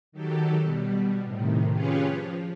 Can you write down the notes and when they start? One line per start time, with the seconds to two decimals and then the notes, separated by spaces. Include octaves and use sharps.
0.12 D#3 F#3 G4 A4
0.62 B2 G3
1.24 A2 C3 D#3
1.71 C#4 F4 G4 G#4 B4 C#5
2.06 F3